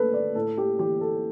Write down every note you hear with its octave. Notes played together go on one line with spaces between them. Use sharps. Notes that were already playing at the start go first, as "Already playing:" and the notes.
Already playing: D3 A3 A4 B4
D5
A2 A4
G4
E3 G4
A4